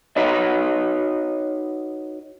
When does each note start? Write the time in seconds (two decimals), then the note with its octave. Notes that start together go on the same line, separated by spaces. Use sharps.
0.17 D#4 F#4 B4 C#5 D#5